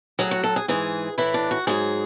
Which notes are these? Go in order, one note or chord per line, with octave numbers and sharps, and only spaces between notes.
A2 F#3 G#4
F#4
A4
G#4
G#2 E3 G#4
A2 E3 E4
D4
F#4
G#2 F#3 G#4